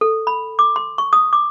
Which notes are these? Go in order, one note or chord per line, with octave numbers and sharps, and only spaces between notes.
A4
B5
D6
C6
C#6
D#6
D6